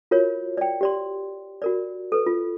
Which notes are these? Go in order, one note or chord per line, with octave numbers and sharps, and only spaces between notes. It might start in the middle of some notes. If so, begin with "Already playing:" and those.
F4 F#4 A#4 C#5
D5 G5
G4 D5 C6
F#4 A#4 D5
A4 B4
F4